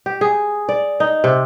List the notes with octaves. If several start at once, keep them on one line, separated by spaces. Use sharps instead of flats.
G4
G#4
D5
D#4
C3